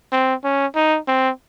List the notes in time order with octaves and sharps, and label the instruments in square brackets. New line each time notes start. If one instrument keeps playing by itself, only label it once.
[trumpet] C4
C#4
D#4
C4